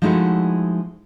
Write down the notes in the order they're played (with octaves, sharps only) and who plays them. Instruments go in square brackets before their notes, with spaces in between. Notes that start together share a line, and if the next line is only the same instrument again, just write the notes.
[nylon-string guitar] F3 G#3 A3 D#4 E4 F#4